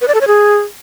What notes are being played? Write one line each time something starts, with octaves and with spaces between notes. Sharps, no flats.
B4
D5
A4
C#5
G#4